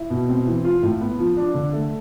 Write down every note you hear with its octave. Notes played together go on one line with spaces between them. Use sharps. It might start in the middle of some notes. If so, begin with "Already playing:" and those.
Already playing: E4
B2
C4
E3
F4
A2
B3
F3
D4
D3
A3